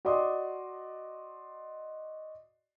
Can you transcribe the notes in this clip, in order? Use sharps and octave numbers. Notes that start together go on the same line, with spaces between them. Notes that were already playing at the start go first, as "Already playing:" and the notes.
F#4 D5 D#5 C6 D6 D#6